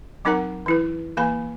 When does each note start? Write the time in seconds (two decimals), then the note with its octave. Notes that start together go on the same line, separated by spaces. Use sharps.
0.25 F#3 C4 D#4 A#4 F#5 A#5
0.66 E3 E4 B4
1.17 E3 A#3 G#5 B5